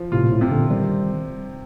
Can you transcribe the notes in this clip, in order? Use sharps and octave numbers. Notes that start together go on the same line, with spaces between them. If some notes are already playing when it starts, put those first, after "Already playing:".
Already playing: F3
A2 C3 F4
A#2
A2
C3
A#2 D3
D#3 G3 C4